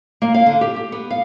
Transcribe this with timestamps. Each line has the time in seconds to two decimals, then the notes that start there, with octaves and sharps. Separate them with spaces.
0.22 A#3
0.34 F5
0.46 D3
0.61 G4
0.76 G4
0.92 B3
1.10 F5